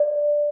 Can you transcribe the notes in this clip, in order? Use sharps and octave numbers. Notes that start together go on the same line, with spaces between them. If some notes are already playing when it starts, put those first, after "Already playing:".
Already playing: D5